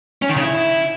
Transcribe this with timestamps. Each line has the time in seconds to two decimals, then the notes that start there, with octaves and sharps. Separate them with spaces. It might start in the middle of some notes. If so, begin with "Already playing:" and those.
0.22 C#4
0.29 D#3
0.36 C#3
0.44 E4